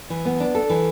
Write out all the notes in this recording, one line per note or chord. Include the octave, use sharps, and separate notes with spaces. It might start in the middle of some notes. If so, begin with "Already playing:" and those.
E3
B3
D4
A4
E3